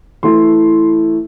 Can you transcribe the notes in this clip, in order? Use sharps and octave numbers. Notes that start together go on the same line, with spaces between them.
E3 A3 E4 C6